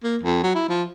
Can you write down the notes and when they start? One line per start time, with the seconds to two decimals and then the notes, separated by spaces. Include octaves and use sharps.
0.04 A#3
0.24 F2
0.43 F#3
0.55 E4
0.69 F3